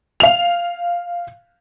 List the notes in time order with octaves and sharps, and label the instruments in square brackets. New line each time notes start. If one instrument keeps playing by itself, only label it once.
[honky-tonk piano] F5 F7